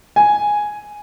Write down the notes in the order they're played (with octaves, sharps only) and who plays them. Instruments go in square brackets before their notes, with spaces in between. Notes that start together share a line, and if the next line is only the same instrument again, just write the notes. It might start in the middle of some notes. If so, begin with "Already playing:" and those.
[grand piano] G#5